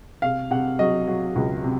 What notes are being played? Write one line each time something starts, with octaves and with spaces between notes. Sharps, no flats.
C3 F5
C3 F#5
F#3 D#5
F#3
C#2
C3